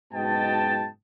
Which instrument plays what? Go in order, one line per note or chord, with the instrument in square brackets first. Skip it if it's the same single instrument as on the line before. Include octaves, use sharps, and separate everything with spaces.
[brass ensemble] F#1 G#2 B2 D#5 G5 A5